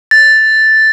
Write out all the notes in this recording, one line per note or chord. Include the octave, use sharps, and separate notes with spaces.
A6